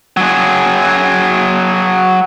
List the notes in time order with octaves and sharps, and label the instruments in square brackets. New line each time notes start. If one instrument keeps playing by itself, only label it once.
[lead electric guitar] F#3 G#4